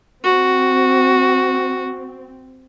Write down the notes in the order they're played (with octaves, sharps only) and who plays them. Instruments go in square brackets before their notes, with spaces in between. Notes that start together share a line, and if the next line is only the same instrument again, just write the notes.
[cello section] C4 [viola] F#4